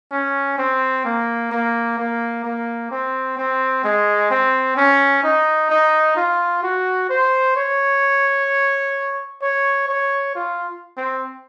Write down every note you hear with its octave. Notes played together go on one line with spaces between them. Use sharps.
C#4
C4
A#3
A#3
A#3
A#3
C4
C4
G#3
C4
C#4
D#4
D#4
F4
F#4
C5
C#5
C#5
C#5
F4
C4